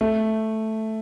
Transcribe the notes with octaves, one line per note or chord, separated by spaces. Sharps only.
A3